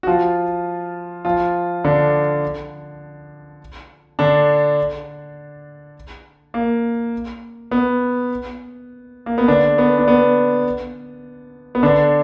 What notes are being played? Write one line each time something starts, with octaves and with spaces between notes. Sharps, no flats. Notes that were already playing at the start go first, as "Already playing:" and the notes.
F#4
F3 F4
F3 F4
D3 D4
D3 D4
A#3
B3
A#3
B3
D3 D4
B3
D4
B3
B3
D3 D4